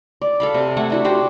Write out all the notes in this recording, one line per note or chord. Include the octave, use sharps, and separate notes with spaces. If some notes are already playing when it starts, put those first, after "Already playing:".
D5
A4 F5 B5
C3
A3 F#5 G#5
D4 E4 F#4
F#4 G4 C5